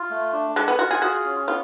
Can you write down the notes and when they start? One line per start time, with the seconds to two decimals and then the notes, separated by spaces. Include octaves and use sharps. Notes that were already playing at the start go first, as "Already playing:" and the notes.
Already playing: F4
0.11 A3
0.33 D4
0.56 G#3 F#5
0.68 B3
0.79 F4 F#4
0.91 G#4
1.02 F#4 G#4
1.25 C#4
1.48 B3 F4